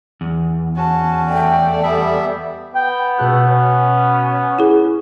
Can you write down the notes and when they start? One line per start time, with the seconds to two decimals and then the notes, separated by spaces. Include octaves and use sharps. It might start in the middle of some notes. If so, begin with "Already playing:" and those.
0.21 E2
0.76 C#4 F#4 A5
1.29 A3 D5 G5
1.83 G3 B3 E5 G#5
2.74 B3 G5
3.18 C#2 B2 A3 F#4 F#6
3.48 C#4
4.59 E4 G#4